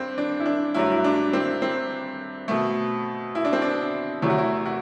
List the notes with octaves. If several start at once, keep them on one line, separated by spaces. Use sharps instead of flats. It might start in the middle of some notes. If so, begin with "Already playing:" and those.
Already playing: G2 C4
D4
E4
D4
G2 F#3 A3 E4
E4
D4
C4
C4
B2 A3
E4
D4
C4
D4
E2 C3 F#3 A3 E4
F#4
E4
F#4